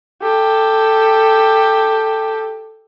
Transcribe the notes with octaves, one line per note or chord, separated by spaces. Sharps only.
G4 A4